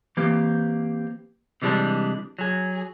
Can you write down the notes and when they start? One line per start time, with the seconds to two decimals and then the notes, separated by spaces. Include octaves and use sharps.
0.17 E3 A#3 C4 G4
1.62 C3 E3 G3 G#3 D4
2.39 F#3 G#4